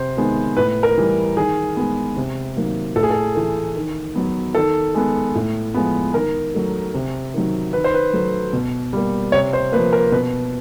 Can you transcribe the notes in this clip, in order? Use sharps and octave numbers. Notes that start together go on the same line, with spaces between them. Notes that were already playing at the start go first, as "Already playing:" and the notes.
Already playing: C3 C5
D#3 G#3 B3
A2 B4
A#4
E3 G3
D#3 G#4
G#3 B3
C3
D#3 F#3 A#3
A2 A4
G#4
A4
E3 A3
D#3
F#3 B3
D#3 A4
G#3 B3
A2
F3 G#3 B3
D#3 A#4
F#3 A3
C3
D#3 F#3
D#3 B4
C5
B4
F#3 A3
B2
G3 A#3
C3 C#5
C5
F3 A#3 B4
A#4
B2 B4